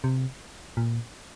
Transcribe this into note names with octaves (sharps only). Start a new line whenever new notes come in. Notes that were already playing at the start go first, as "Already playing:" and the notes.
C3
A#2